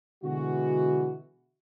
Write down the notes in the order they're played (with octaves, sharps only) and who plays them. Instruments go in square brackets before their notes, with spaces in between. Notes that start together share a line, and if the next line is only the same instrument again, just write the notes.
[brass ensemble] B2 D3 E3 G#3 F#4